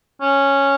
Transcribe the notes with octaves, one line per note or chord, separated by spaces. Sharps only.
C#4